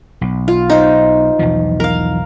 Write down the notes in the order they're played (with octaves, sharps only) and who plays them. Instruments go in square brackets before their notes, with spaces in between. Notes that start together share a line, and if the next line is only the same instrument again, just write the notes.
[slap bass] B1
[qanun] F4
D#4 C5
[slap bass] B1 E2 F3
[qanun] A#4 F5